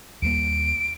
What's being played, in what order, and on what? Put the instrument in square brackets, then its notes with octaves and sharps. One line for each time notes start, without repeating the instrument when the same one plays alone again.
[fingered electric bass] D#2 G3 A#3 [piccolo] D7